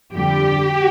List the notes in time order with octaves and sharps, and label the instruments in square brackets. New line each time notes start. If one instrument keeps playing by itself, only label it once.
[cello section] F2 D3 G3 G4